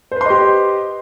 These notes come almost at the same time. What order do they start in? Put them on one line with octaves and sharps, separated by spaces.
C5 B4 C6 D#5 G4